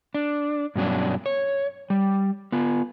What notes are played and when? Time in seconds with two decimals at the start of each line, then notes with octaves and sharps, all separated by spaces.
0.14 D4
0.76 G2 B2 F#3 C#4 D4
1.26 C#5
1.90 G3
2.52 B3 F4